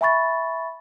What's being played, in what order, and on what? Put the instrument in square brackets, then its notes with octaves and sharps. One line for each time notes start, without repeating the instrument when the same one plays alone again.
[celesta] E5 G#5 B5 C#6 A6